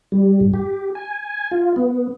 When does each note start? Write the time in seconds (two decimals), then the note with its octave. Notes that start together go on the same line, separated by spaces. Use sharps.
0.12 G3
0.40 G2
0.54 G4
0.95 G#5
1.51 F4
1.76 B3